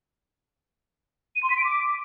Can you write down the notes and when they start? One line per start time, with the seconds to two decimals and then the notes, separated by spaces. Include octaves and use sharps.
1.36 D#7
1.43 C6
1.50 B6
1.57 D7
1.64 D6